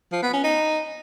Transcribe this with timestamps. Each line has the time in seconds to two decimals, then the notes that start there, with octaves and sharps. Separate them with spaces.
0.12 F3
0.23 B3
0.33 C#4
0.44 D#4